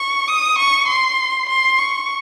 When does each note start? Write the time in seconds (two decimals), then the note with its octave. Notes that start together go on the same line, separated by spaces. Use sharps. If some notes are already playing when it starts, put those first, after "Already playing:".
Already playing: C#6
0.28 D#6
0.58 C#6
0.87 C6
1.49 C6
1.78 C#6